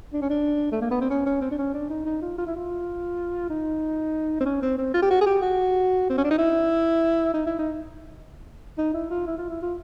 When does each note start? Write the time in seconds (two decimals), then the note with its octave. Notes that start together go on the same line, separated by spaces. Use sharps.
0.13 D4
0.22 C#4
0.30 D4
0.72 A3
0.81 A#3
0.91 B3
1.01 C4
1.10 C#4
1.26 C#4
1.41 C4
1.51 D4
1.58 C#4
1.74 D4
1.90 D#4
2.05 D#4
2.22 F4
2.38 F4
2.47 E4
2.56 F4
3.50 D#4
4.41 C4
4.45 C#4
4.62 C4
4.78 C4
4.94 F4
5.02 G4
5.10 F#4
5.21 G#4
5.26 G4
5.42 F#4
6.10 C4
6.17 C#4
6.24 D4
6.31 D#4
6.38 E4
7.34 D#4
7.46 E4
7.59 D#4
8.78 D#4
8.94 E4
9.10 F4
9.27 E4
9.38 F4
9.50 E4
9.62 F4